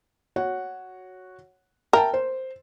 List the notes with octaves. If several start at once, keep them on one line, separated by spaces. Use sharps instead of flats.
F#4 C#5 F#5
A#4 E5 G5 A5
C5